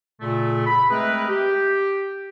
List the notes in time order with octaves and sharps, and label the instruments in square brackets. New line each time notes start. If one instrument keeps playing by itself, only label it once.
[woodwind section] A#2 C#3 A3
B5
G#3 A3 C4 G#4 A#4 B4
G4